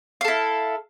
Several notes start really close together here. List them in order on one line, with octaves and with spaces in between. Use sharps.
F5 A4 E4